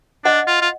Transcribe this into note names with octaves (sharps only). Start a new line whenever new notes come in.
D4 D#5 F#5
F4
F4